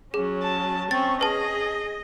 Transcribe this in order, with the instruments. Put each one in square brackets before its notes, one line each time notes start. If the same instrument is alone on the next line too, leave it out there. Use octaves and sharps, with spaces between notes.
[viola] F#3 C#4 [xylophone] G#4
[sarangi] A5
[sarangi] C4 [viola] C#4 C#6 [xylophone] A6
[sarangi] G#4 [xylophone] B4 A5 [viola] D#5